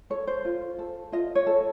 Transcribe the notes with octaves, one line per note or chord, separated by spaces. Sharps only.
A4 C#5
C5
F4
A4
F4 D#5
C#5
A4